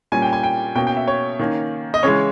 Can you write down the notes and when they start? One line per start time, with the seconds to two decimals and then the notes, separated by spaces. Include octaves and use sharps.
0.12 A#2 G3 C#4 G#5
0.22 G5
0.33 G#5
0.43 G5
0.75 B2 A#3 C#4 G5
0.87 G5
0.97 E5
1.08 C#5
1.39 D#3 A#3 C#4
1.94 D#5
2.03 C#3 E3 G#3 C#5